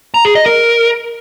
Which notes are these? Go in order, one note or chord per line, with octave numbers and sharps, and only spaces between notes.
A#5
G#4
D#5
A#4